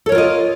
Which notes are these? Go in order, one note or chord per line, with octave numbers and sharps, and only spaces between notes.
F4 A4 A#4 C#5 D#5